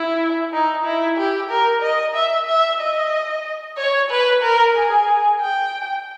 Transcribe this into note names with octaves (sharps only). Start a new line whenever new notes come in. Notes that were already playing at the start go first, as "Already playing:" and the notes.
Already playing: E4
D#4
E4
G4
A#4
D#5
E5
E5
D#5
C#5
B4
A#4
G#4
G5